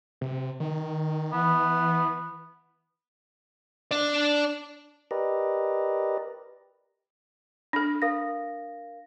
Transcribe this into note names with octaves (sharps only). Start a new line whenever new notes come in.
C3
D#3
E3 B3
D4 D5
G4 A#4 B4 D5 D#5
D4 A4
A#4 F5 A#6